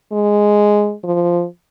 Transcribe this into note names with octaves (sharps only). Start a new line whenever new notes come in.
G#3
F3